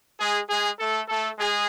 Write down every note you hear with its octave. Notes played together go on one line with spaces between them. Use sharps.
G#3 G#4
G#3 G#4
A3 A4
A3 A4
G#3 G#4